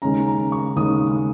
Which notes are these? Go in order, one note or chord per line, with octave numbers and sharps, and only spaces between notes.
D#2 C#3 G#3 C#4 A#5
A#5
C#6
D#2 C#3 G#3 C#4 D#6